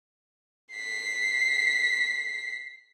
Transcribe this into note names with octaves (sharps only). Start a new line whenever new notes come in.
B6 C7